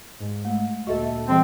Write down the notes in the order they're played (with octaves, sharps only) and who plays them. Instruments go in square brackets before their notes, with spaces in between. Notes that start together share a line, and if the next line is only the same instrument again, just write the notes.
[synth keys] G#2
[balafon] G#3 A3
[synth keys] D2 A#2 A4 [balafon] F#4 D#5 E5
[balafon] E5
[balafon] E3 G3 G#4 [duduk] C4